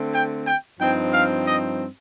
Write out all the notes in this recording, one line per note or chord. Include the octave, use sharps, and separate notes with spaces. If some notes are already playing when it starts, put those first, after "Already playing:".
Already playing: D3 A3 C4
G5
G5
G2 F3 C4 D#4 G5
F5
D#5